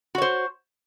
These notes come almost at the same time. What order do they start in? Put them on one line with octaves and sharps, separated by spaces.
F#4 C#5 C5